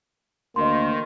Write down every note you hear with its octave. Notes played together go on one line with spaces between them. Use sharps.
D2 D#3 A#3 D#5 C6